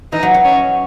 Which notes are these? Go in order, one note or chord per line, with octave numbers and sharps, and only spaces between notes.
E3 D#4
F#3
F#3
C#4